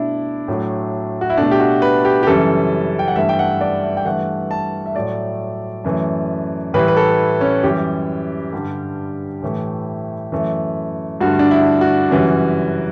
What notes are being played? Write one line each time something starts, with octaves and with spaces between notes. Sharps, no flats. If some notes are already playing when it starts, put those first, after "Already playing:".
Already playing: B2 A3 D4 E4
A2 F#3 A3
F#4
E4
B2 A3 D4
G4
F#4
B4
G4
G4
F#2 C#3 E3 G3 A4
G5
F#5
G2 E3 A3 E5
G5
F#5
D5
E5
G5
G2 E3 A3 F#5
A5
E5
A2 F#3 A3 D5
F#2 E3 A3
A2 E3 G3 B4
B4
A4
C#4
F#2 E3 G3 G4
G2 D3 G3
A2 E3 A3
F#2 E3 A3
G2 D3 A3 F#4
D4
E4
F#4
F#2 C#3 E3 G3